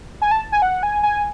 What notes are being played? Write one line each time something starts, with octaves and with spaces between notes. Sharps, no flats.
G#5
A5
G#5
F#5
G#5
G#5